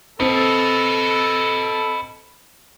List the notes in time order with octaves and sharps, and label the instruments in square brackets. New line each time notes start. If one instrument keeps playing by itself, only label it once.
[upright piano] C4 [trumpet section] A4 [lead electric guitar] B4 D#5